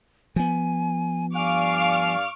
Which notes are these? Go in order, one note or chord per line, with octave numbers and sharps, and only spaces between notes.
F3 B3 G#5
G2 D5 F5 G#5 C#6 D6 F6